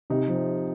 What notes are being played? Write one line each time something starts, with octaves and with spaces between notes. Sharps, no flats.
C3 D#4
F3